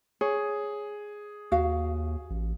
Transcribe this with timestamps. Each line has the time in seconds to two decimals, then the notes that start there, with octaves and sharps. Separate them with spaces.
0.21 G#4 C#5
1.52 D#2 F#4 F5
2.30 A1